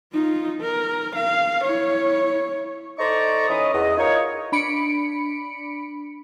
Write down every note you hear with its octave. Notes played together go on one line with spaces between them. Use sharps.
D#4 F4
A#4
F5
E4 C#5
D#4 A4 C5 D5 A#5 C#6
E3 C#4 D#4 B4 D#5 D#6
E2 D#5
D#4 F4 A#4 C#5
D4 B5 C#7 D7